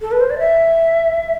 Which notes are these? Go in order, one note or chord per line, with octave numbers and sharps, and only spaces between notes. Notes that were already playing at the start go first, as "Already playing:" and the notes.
A4
B4
C5
D5
E5